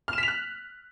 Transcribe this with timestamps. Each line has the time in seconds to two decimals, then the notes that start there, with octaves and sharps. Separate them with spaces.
0.08 F6
0.13 E7
0.18 B6
0.23 F7
0.28 F#6